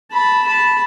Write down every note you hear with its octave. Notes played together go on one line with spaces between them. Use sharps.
A5 B5
A5 B5